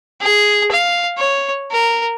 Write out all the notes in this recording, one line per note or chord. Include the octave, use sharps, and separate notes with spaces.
G#4
F5
C#5
A#4